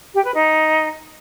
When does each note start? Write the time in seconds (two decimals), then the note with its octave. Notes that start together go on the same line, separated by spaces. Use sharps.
0.14 G4
0.24 B4
0.34 D#4